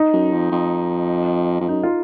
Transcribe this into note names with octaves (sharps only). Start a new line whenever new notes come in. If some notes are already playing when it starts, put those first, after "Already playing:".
Already playing: D#4
F#2
F2
F2
F2
F#2 D#4
F4